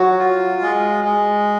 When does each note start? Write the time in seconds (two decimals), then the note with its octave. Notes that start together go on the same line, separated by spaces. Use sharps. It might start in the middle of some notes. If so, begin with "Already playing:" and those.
Already playing: F#3 F#4
0.19 F4
0.62 G#3
1.04 G#3